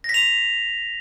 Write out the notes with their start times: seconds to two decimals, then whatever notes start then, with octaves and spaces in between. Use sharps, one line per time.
0.04 A#6
0.09 B6
0.14 F7